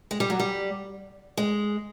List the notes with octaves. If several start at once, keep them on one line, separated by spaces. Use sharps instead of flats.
G#3
G3
F#3
G3
G#3